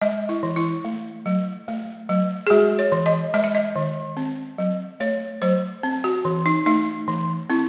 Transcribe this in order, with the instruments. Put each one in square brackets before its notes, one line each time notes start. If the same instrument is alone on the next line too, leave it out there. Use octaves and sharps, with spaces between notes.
[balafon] G#3 D#5
E4
E3
E4
A3
F#3
A3
F#3
G#4
G#3 F#4
C#5
E3
D#5
G#3 D#5
E5
D#5
D#3
C4
F#3
A3 C#5
F#3 C5
C4
F#4
E3
D#4
A3 D#4
E3
C4 E4